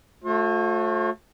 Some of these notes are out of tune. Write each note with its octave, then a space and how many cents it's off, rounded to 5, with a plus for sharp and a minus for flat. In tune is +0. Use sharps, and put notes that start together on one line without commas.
A3 +0 F4 +45 C5 +45